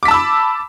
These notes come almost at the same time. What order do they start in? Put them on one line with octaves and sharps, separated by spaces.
D6 B6 A5 E6 B5